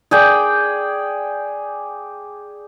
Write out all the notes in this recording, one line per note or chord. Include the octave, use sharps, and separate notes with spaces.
G#4 D5 G5